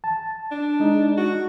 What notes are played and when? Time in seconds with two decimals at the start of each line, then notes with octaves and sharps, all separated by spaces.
0.04 A5
0.51 D4
0.80 G#3 D#4
1.17 F#4